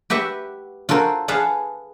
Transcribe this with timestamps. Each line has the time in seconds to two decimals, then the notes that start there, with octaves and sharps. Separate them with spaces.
0.10 F#4 G4 B4 E5 F#5
0.89 F4 F#4 A4 A#4 C5
1.28 G#4 B4 F5 F#5 A5